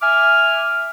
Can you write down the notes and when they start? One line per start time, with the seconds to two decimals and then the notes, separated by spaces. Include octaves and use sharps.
0.02 E5 G#5 D6 F6